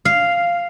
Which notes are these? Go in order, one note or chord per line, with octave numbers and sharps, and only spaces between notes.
F5